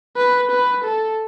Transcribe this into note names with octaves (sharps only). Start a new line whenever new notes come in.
B4
B4
A4